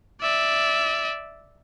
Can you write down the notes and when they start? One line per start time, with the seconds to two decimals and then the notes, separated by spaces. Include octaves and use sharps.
0.21 D5 E5